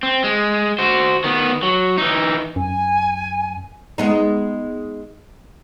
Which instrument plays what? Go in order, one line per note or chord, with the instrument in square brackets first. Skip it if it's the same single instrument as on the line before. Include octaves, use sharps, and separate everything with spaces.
[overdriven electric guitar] C4
G#3
F#4 C5
D#3 B3
F#3
E3 D#4
[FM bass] F#2 [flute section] G#5
[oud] G#3 B3 D#4